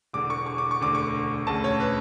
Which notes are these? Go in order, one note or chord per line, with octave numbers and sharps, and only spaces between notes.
E1 E2 D3 D6
C#6
C#6
D6
C#6
E1 D2 D3 D6
C#6
E1 D2 C#3 A5
C#5
B4